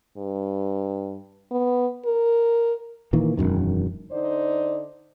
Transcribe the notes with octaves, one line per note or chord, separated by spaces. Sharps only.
G2
B3
A#4
A#2 D#3 E3 A#3
E1 B1 F#2 D#3
D3 D#4 C5 D5